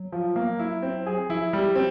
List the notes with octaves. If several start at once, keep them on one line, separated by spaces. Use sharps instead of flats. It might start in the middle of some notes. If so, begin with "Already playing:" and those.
Already playing: F#3
F3
A#3
E4
C4
G#4
F3 E4
G3
C4